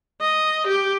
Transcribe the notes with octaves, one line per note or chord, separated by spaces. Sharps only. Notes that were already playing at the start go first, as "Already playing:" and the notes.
D#5
G4